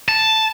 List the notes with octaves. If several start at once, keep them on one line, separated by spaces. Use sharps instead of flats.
A5